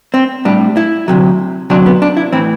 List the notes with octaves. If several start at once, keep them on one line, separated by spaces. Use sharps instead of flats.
C4
A2 G3 D4
E4
D2 C3 F#3
D2 C3 F#3 D4
B3
D4
E4
A2 E3 C4